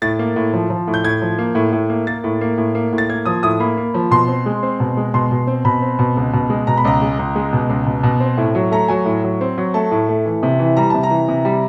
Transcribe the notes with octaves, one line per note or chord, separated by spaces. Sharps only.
A2 A6
A#3
A2
F3
F3
A2
G6
A2 G#6
F3
A#3
A2
A2
A#3
A#3 A6
A2
A#3
A2
A#3
A2
A6
A#3 G#6
F3 D#6
A2 D#6
A#3 B5
A#3
F3
B2 C6
C4
G#3
C4
B2
G#3
B2 C6
B2
C4
B2 B5
C4
B2
C#2
B2
G#3
B2 A#5
B5
C#2 A#5
G#3
C#2
G#3
B2
C#2
B2
B2
C4
A2
F#3
A3 A#5
F#3 G#5
A2
F#3
C4
F#3
A3 A5
A2
A3
E3
C3
E3
G3 A#5
C3 A5
A#5
E3
C3
G3